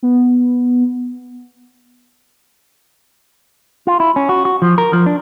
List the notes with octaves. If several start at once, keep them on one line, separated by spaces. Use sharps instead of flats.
B3
F4
E4
C#4
F#4
F#4
F3
A#4
F3
D4